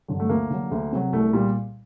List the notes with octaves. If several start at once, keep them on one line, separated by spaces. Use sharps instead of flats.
G2 D3 F#3
A3
D2 A#3
D3 F#3
D2
C3 F#3
C2 A3
A#2 G3